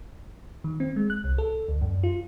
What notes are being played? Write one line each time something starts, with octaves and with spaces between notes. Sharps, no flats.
D#3
C4
G#3
F#6
C2
A4
D2
F#2
F4